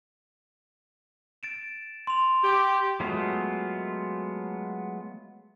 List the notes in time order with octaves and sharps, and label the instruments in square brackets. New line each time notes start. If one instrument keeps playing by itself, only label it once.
[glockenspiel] A6 D7 E7
C6 F7
[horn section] G4
[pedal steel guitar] F#3 G#3 A3 B3 F4